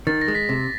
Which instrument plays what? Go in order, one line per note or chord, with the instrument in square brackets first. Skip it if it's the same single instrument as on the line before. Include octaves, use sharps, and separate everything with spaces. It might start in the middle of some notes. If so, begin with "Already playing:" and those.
[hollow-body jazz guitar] D#3 [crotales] A6
[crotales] A#6
[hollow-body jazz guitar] G#3
[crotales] B6
[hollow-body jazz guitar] C3